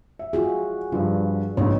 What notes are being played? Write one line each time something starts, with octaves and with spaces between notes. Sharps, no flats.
E5
F4 F#4 G#4
G2 F3 D4
A#1 G#2 B3 D#4 C#5